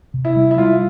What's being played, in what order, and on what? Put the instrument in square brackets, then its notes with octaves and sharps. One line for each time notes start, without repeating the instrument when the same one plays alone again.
[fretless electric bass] C3
[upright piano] E4
[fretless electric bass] G3
[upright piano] E4
[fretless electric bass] G3 [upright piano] F4